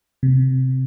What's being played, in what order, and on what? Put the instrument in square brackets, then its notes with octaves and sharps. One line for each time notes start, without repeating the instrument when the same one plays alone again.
[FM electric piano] C3